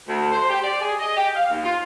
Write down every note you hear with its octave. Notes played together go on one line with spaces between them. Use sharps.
D2
C5
G4
D5
G#4
D#5
G4
F5
D#2
F4